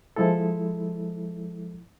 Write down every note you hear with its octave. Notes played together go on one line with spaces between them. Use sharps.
F3 G#3 E4 A4